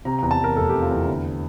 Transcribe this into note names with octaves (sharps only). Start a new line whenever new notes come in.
C3 A#5
E2 A#5
A5
E3 A#4
F1 A4
C3 G4
F4
E2 E4
D3